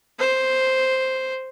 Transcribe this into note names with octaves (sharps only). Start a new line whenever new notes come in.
C5